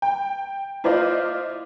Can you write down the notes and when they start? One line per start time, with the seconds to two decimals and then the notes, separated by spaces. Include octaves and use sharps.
0.02 G5
0.84 E4 F4 C5 D5 D#5 F5